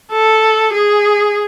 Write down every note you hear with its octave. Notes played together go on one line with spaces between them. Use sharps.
A4
G#4